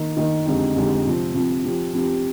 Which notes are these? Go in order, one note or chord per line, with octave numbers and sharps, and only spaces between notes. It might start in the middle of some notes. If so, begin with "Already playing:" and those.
Already playing: D#3 A#3 D#4
D#3 A#3 D#4
F2 D3 G#3 D#4 G4
F2 D3 G#3 D#4 G4
C3 F3 C4
C3 F3 C4
F3 C4 G4
F3 C4 G4